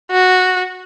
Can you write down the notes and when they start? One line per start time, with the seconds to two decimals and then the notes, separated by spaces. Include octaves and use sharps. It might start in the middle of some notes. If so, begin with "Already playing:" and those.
0.11 F#4